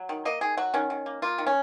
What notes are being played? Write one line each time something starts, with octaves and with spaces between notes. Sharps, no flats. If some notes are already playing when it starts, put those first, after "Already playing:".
Already playing: F#3
D#3
A#3 D#5
D#3 G#4
F#3 F#4
D#3 C#4
D#3
A#3
A#3 F4
D#3
C#4